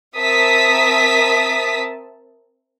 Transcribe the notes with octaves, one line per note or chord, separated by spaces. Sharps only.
C4 A#4 E5 A5 D#6 B6